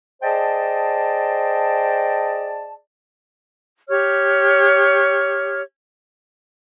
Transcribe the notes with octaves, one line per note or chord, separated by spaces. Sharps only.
G#4 C5 D5 D#5 G5 A5
G4 C#5 F6